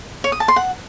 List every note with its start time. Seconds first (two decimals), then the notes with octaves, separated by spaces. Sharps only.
0.24 C#5
0.32 D#6
0.40 A5
0.48 C6
0.56 F#5